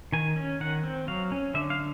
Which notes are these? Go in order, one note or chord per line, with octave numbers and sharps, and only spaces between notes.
D#3 G#5
C#4
D#3 F#5
C4
F#3 F5
C#4
D3 E5
F5